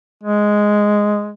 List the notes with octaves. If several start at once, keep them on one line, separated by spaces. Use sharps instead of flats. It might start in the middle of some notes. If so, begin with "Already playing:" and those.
G#3